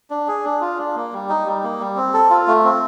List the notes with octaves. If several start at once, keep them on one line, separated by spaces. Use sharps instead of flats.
D4
G#4
D4
F4
D4
A#3
G3
D#4
G3
A#3
G3
C4
A4
F4
A3
C4